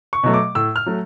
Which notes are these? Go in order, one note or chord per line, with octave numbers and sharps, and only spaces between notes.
C#6
B2 F#3 A3
D6
A2 E6
F6
F#3 A3